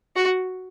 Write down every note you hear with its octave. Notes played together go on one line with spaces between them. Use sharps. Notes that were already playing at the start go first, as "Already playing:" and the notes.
F#4